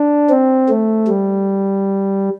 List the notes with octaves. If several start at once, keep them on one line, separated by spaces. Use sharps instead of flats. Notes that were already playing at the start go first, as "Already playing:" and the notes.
Already playing: D4
C4
A3
G3